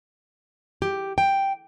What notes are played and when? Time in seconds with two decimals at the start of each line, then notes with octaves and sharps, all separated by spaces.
0.82 G4
1.18 G5